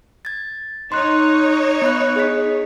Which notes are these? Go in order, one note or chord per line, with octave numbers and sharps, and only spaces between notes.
G#6 A6
D#4 C#5 C6 F#6
B3 B5 F#6
G#4 D#5 B6